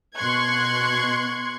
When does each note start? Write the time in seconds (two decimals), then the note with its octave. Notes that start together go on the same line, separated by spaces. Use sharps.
0.17 B2 C6 C#6 F#6 G#6